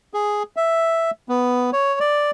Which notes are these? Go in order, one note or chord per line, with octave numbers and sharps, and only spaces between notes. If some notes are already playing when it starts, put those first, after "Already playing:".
G#4
E5
B3
C#5
D5